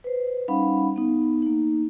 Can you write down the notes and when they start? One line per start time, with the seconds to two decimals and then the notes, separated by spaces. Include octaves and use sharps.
0.04 B4 C5
0.48 G3 C#4 D#4 F5 F#5 B5
0.96 B3 D#4
1.42 A#3 D#4